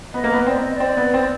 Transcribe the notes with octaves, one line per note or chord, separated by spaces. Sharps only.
B3 D#5
A#3
B3
C4 D5
D#5
D5
C4
B3
C4